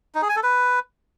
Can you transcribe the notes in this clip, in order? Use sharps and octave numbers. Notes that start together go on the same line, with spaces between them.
D#4
G#4
G#5
A4
B4